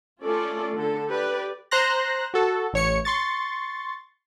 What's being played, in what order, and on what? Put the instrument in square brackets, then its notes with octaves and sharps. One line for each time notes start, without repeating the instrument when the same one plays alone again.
[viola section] A3 C#4 F4 A4 D5
D3 A4
G4 B4 D5
[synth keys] C5 A#5 C6 F#6 A#6
F#4 A4
A1 C#5 C#7
C6 C#6 A6